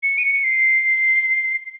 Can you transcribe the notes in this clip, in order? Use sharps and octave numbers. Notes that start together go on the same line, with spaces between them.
C#7
D#7
C#7
C7